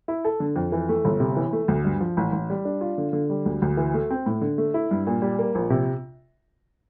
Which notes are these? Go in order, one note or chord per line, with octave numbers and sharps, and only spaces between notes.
E4
A4
D3
F2
E3
A3
G1
C3
E3
A3
D2
G2
F3
A1
A1
G3
D4
F4
D3
D3
G3
D2
D2
E3
A3
C4
A2
D3
A3
E4
G2
A#2
G3
A#3
A#1
C3